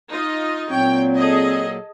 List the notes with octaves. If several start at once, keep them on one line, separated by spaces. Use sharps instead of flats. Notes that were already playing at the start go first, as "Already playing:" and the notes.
D#4 F4 D#5
A#2 F#3 C4 C#5 G5
G#4 A4 D#5